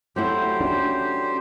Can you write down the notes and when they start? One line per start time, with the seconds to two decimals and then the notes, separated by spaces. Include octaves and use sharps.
0.16 F#3 A3 E4 G4 C5
0.61 C#4 D4